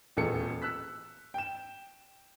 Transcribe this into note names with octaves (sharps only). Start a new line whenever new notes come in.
D#1 A1 E2 G#4 A4 C#7
E6 F#6 B6
G5 E7